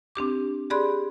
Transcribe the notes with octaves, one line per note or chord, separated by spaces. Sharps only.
C4 D4 G4 D6
G4 G#4 D5 B5 C6 F#6